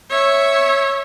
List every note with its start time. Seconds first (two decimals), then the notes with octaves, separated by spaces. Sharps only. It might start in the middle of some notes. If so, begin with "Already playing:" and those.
0.10 C#5 E5